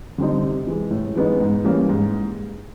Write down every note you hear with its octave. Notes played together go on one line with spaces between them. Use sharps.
D3 G3 C4 D#4
C3
E3 G#3
A2
E3 G#3 B3 D#4
G#2
E3 G3 A#3 C#4
G#2